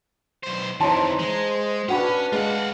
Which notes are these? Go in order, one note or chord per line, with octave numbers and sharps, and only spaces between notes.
B1 C5
F2 E3 D#4 C5 C#5 A5 C6
G#3 C5
C#4 D4 F#4 B4 F#5 B5
G#3 F4 F#5